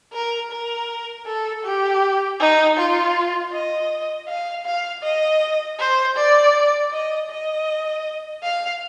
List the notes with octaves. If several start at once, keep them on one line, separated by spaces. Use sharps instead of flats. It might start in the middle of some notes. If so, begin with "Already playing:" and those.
A#4
A#4
A4
G4
D#4
F4
D#5
F5
F5
D#5
C5
D5
D#5
D#5
F5